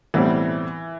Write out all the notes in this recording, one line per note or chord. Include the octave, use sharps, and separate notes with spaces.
B1 A2 E3 G3 C4 E4